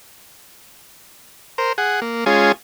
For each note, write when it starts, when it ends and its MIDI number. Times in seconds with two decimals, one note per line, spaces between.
1.58 1.73 70
1.58 1.73 72
1.78 2.00 68
1.78 2.00 78
2.02 2.25 58
2.26 2.52 56
2.26 2.52 61
2.26 2.52 65
2.26 2.52 68